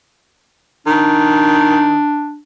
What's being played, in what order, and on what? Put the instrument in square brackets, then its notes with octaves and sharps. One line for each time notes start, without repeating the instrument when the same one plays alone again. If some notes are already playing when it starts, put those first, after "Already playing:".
[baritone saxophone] D#3 [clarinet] D4